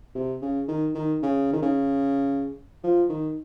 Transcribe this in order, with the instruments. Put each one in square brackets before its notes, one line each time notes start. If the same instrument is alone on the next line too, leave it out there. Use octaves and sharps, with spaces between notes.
[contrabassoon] C3
C#3
D#3
D#3
C#3
D#3
C#3
F3
D#3